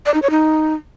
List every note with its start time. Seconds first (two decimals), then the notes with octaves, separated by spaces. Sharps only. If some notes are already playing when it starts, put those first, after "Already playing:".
0.06 D5
0.14 D#4
0.22 C#5
0.30 D#4